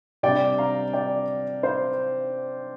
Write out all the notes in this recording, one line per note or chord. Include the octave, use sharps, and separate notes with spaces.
C3 G3 D4 D5 G5
F5 A#5
D5 G5
C5 F5